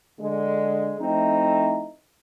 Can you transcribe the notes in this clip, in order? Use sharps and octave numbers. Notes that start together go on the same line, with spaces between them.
D3 G#3
F3 A3 C4 D#4 E4